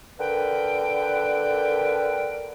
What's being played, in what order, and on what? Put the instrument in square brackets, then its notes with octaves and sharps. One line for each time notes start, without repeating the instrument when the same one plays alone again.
[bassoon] D3 [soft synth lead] A#4 [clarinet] B4 [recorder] G5